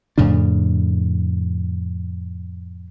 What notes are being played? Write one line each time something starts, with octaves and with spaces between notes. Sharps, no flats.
F2 A2 C#3 D4